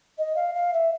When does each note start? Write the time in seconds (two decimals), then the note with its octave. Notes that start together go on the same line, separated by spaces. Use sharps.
0.18 D#5
0.36 F5
0.54 F5
0.73 E5